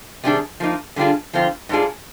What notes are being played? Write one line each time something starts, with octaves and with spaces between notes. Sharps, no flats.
C3 D#3 G3 D4 G#4
F3 A#3 D#4
D3 G3 D4 F4 G#4
D3 F3 C4 F4
G#2 G3 D4 F4 G#4